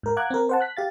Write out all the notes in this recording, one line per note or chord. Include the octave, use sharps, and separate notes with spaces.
G#2 A#4
F5 F#5 A#5 D6 F#6 G#6
C4 A#4
C5 F#5 A5
F#6 B6
G4 F5 A6